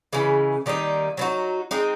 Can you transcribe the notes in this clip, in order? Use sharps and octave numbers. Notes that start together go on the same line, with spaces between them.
C#3 E3 G#3
D#3 G3 A#3 D#4
F#3 B3 D#4 F#4
G#3 C4 D#4